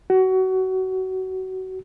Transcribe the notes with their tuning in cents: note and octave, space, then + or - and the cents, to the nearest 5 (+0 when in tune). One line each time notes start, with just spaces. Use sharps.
F#4 +25